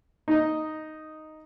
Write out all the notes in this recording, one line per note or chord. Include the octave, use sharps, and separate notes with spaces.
D#4 D#5